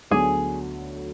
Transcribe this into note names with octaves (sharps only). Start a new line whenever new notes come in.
D2 D3 F#3 B3 G#4